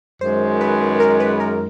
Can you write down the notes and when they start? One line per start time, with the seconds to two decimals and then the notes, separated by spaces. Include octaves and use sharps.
0.21 F#2 D#3 G#3 C5
0.61 B4
1.00 A#4
1.20 B4
1.40 A#4